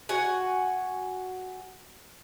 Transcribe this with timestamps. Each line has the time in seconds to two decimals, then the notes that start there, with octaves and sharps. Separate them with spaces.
0.09 F#4 F#5 G#5